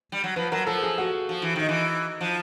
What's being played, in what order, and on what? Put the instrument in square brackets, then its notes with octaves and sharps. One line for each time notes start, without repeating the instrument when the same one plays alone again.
[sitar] G3
F#3
[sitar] F3 [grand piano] B4
[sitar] F#3 [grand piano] A#4
[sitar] F3 [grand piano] A4
[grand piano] G#4
F#4
[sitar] F3
E3
[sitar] D#3 [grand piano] D#4
[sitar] E3
F3